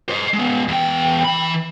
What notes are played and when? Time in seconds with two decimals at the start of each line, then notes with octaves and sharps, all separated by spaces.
0.09 C5 D#5
0.34 G#3 B3
0.68 E2 G5
1.25 E3 B5